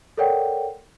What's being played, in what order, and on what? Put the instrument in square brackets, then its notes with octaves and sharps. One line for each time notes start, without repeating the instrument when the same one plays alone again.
[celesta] A4 A#4 C#5 D5 F#5 G5